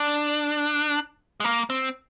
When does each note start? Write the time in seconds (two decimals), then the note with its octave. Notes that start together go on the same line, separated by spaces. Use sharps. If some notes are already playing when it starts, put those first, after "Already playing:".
Already playing: D4
1.40 G#3
1.44 A#3
1.70 C4